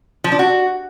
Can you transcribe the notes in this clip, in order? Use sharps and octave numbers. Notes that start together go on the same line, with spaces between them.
F3
D4
F#4